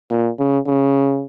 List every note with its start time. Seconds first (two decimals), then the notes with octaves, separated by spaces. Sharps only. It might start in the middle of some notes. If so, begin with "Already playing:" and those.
0.10 A#2
0.39 C#3
0.67 C#3